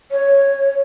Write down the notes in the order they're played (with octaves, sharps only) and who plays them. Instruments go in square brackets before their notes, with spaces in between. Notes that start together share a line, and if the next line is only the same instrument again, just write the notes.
[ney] C#5